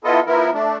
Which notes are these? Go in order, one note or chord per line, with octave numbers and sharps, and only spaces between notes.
B3 E4 F4 A4 D#5
F3 B3 E4 A#4
A3 D4